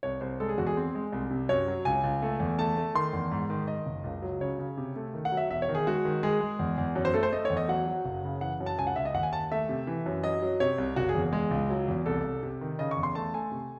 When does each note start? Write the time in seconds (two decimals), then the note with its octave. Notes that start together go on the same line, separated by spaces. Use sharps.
0.03 C2 C#5
0.21 C2 C5
0.40 G#3 A4
0.49 G#4
0.58 E2 F#4
0.67 G#4
0.77 C4
0.95 G#3
1.12 C2
1.30 C3
1.49 F#2 C#5
1.68 F#3
1.85 C#2 G#5
2.04 C#2
2.22 A3
2.40 E2
2.58 A3 A5
2.77 A3
2.95 D#3 C6
3.13 E2
3.31 G#2
3.50 D#3
3.67 D#3 D#5
3.86 F#1
4.04 C#2
4.22 F#3
4.41 C#3 C#5
4.59 C#3
4.77 C3
4.96 A3
5.14 D#3
5.25 F#5
5.32 F#3
5.37 E5
5.50 E1 E5
5.62 C#5
5.69 D#3
5.75 G#4
5.87 G#3 F#4
6.05 D#3
6.23 G#3 G#4
6.41 G#3
6.59 E2
6.78 E2
6.96 F#2
7.05 C5
7.14 A3 A4
7.23 C5
7.33 A3 D#5
7.45 C#5
7.50 E2
7.57 D#5
7.69 F#3 F#5
7.87 F#3
8.05 F#1
8.24 C#3
8.41 E3 F#5
8.60 F#2
8.66 A5
8.78 C#2 G#5
8.87 F#5
8.96 C#2 E5
9.05 D#5
9.14 D#2 F#5
9.23 G#5
9.32 D#2 A5
9.52 A3 E5
9.69 C3
9.87 E3
10.06 F#2
10.24 F#3 D#5
10.42 F#3
10.60 C3 C#5
10.78 C2
10.96 F#1 F#4
11.09 G#4
11.15 E2
11.33 G#3
11.51 C#2
11.70 F#3
11.88 E2
12.06 C2 A4
12.24 C2
12.43 C3
12.61 D#3
12.79 C#3 D#5
12.91 C#6
12.97 E2
13.03 C6
13.15 A3 A5
13.34 A3 G#5
13.51 C3